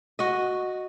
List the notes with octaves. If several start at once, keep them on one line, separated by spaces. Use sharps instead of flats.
F#4 D#5